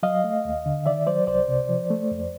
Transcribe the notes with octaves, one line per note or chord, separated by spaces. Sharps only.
F#3 D#5 F5
A3
D#2
D3
D#3 D5 E5
F#3 C5 D5
C2 C5 D5
C3
F3
A3
F2